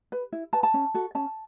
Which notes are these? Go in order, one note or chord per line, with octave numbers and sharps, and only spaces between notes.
B4
E4
B4 A5
A5
C#4
F#4 A4
C#4 A5